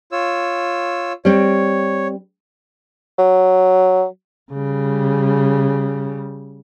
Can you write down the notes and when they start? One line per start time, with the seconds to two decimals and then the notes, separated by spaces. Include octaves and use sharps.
0.12 F4 C#5 E6
1.25 G3 C4 C#5
3.18 F#3
4.52 C#3 G3